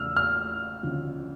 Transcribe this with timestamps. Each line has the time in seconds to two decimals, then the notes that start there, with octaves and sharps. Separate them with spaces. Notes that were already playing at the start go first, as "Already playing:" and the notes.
Already playing: E2 C#3 F3 A3 E6 F6
0.17 F6
0.83 D2 C#3 F3